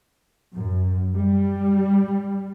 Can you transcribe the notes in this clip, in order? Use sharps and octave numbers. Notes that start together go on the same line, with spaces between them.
F#2
G3